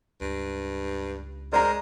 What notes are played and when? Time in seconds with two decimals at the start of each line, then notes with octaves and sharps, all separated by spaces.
0.21 C#2 G2
1.53 G#3 A#4 C5 D5 A#5